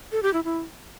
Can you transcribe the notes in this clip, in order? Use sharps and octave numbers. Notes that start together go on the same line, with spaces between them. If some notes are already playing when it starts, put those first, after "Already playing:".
A4
G4
E4
E4